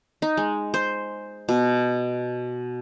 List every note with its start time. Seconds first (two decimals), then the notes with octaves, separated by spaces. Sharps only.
0.22 D#4
0.37 G#3
0.74 C5
1.49 B2